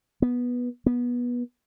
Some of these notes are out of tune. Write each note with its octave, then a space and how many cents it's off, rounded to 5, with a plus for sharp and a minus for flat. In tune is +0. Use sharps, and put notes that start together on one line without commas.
B3 -10
B3 -20